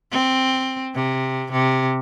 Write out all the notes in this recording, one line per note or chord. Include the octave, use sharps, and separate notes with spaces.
C4
C3
C3